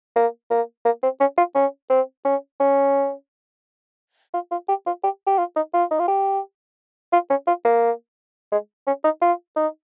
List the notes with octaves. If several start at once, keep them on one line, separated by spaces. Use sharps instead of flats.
A#3
A#3
A#3
C4
C#4
F4
C#4
C4
C#4
C#4
F4
F4
G4
F4
G4
G4
F4
D#4
F4
D#4
F4
G4
F4
C#4
F4
A#3
G#3
C#4
D#4
F4
D#4